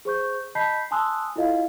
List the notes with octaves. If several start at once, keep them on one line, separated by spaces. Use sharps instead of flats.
G#4 C5 C#6 G6
D#5 A5 B5 G6 B6 C7
G#5 A5 C6 D#6 E6 F#6
E4 F4 A4 D#5 F5